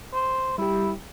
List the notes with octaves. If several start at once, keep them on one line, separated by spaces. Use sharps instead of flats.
C5
G3 E4 G4